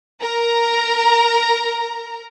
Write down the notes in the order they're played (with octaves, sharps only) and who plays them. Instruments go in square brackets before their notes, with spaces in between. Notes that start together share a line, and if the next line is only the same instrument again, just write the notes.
[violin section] A#4 A#5